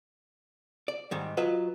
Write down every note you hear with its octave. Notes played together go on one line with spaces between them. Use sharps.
D5
G#2 D#3 G3
F#3 F4 B4 D#5